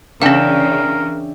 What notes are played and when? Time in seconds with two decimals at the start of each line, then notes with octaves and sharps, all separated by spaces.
0.22 C#3 E3 C#4 D4 A#4 E5 F5 G5